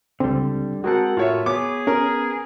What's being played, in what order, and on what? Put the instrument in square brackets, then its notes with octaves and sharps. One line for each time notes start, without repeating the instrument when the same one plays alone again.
[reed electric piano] C#2 C4 [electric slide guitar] D3 G3
[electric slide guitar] G#3 C4 [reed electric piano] F#4 A#4 A5 [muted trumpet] F#5
[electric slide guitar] A2 [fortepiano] F4 C#5 E5
[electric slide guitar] B3 B4 [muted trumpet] G#4 [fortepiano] C#5 D6
[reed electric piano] C#4 [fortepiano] A#4